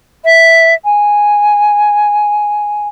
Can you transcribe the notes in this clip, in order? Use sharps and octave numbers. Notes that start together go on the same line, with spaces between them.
E5
G#5